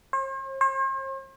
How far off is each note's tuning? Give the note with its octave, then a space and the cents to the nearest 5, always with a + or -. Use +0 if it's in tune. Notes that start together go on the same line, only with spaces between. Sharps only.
C5 +45
C5 +45